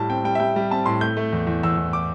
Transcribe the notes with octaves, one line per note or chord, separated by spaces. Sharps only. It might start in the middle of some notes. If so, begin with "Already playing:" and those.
Already playing: A2 G3 A5
C4 G5
G3 G5
E5
G3 G5
G3
C4 A5
A2 C6
A3 G6
A3
E2
E2
E2 E6
E2
D6